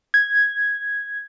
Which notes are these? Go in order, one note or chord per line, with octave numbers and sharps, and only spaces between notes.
G#6